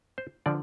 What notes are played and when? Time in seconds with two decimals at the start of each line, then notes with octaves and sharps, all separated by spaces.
0.18 C5
0.46 D3 F3 D5